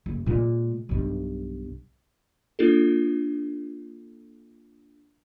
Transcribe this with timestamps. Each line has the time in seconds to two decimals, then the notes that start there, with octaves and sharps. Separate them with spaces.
0.06 F#1
0.26 A#2 G#3
0.89 B1 G2
2.59 A#3 D4 F4 A4